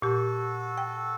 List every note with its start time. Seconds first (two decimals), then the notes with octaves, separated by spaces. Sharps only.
0.02 A#2 F#4 G4 A4
0.78 G5